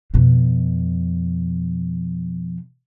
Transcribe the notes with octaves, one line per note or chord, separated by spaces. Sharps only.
F2 B2